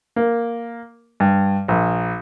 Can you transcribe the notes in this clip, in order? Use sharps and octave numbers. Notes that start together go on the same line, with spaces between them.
A#3
G2
A#1